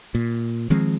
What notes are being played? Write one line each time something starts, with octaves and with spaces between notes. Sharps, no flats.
A#2
D#3 F3 G#3 C4